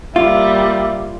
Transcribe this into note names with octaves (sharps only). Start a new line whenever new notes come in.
G3 A#3 F4 E5